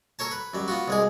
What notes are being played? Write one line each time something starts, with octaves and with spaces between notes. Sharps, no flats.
A4 A#4 C#5 A5
B4
F#2 G3
B3 F4 F#4
C2 G#3 G#4